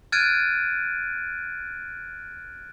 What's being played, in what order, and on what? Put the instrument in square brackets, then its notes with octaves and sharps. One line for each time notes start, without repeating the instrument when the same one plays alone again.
[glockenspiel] F6 F#6 G#6 A6 D7 D#7